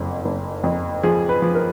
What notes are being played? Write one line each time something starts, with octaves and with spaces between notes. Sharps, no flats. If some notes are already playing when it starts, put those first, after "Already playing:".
Already playing: F#1 F2
F#1
F2
F3 G#4
B4
F3
A#4